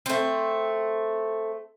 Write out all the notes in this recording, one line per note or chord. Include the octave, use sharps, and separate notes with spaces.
A3 C4